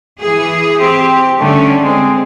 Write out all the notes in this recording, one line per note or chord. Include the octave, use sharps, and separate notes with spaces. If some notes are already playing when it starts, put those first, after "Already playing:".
E3 G#4
C4 G4
D3 G3 A3 C#4
G#3 C4